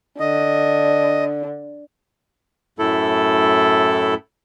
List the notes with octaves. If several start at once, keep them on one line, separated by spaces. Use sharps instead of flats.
D3 D#5
F#2 A2 A3 E4 A4